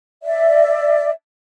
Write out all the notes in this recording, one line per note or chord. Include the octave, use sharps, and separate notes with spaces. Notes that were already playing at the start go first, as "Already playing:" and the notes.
D5 E5